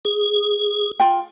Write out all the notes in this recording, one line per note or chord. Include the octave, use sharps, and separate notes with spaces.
G#4
F4 G5